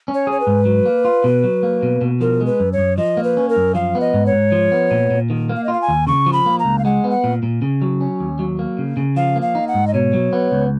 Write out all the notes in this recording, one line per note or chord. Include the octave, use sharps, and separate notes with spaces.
C#4
C#5
G#4 C#5
B4
G#2
F#3
A#3
F4
B2
F#3
A#3
B2
B2
F3 A#4
G#3
B4
F#2
C#5
F#2
F3 D#5
A#3
B4
C#4
A#4
F#2
F3 F5
B3
D#5
G#2
C#5
G#2
F3
B3
A#2
A#2
D#3
A#3
F5
D#5
F4
F5
G#5
D#2
C#3 C#6
F3
B5
A#3
A#5
C#2
F5
G#3 F#5
B3
F#5
A#2
A#2
C#3
F#3
C#4
D#2
F#3
A#3
C#3
C#3
F3 F5
A#3
F5
D#4
F#5
G#2
D#5
B2 C#5
F#3
B3
C#2